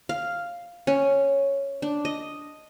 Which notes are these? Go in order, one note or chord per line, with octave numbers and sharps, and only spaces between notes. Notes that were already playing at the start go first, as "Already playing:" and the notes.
F5
C#4
D4
D#5